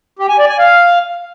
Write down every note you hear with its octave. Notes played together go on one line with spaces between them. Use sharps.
G4
G#5
D5
G#5
F5